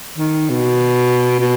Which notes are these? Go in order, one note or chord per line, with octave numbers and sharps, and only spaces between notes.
D#3
B2
B2